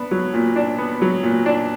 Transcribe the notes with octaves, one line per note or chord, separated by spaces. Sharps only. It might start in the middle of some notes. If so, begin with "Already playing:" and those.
Already playing: B3 D4
F#3
A#2
D4
B3
F#3
A#2
D4